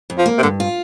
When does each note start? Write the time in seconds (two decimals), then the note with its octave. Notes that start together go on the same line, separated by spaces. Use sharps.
0.10 F2
0.18 F3
0.26 A#3
0.38 C3
0.43 G2 D3
0.60 F4